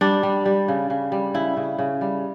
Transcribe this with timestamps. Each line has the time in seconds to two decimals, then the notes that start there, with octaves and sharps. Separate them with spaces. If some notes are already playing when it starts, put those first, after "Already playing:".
0.01 G3 D4
0.23 G3
0.46 G3
0.68 C#3
0.90 C#3
1.12 G3
1.34 C#3 E4
1.57 C#3
1.79 C#3
2.01 G3